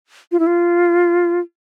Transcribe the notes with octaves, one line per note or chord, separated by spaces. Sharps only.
F4
E4
F4